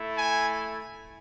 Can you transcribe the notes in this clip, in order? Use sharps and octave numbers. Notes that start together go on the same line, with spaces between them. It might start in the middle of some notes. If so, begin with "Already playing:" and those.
Already playing: A3 E4
G#5